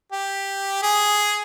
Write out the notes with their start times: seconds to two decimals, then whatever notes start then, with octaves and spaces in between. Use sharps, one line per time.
0.12 G4
0.83 G#4